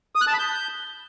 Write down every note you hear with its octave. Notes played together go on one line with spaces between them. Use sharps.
D#6
F#6
A5
B5
G6